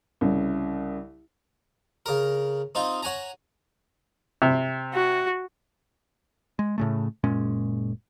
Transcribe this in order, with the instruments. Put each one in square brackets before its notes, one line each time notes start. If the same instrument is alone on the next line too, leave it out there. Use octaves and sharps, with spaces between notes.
[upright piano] C2 C#3
[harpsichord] C#3 A#4
C4 D#4 F4
C#5 F#5 G#5 A#5
[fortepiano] C3
[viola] F#4
[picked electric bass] G#3
A2 C#3 A3
F#1 A#2 G#3 C#4